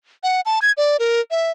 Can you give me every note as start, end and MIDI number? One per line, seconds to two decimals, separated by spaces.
0.23 0.41 78
0.46 0.59 81
0.62 0.72 92
0.77 0.97 74
0.99 1.21 70
1.31 1.51 76